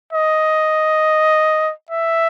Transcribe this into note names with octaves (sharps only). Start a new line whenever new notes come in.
D#5
E5